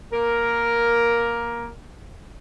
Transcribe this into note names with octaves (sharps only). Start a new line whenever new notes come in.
A#3 A#4